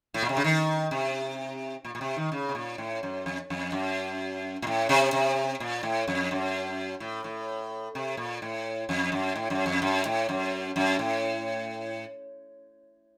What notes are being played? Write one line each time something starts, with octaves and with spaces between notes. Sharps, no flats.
A2
A#2
C3
C#3
D#3
C3
A#2
A#2
C3
D#3
C#3
C3
A#2
A2
F#2
F2
F2
F#2
A#2
A2
C3
C3
A#2
A2
F2
F#2
A2
A2
C3
A#2
A2
F2
F#2
A2
F#2
F2
F#2
A2
F#2
F#2
A2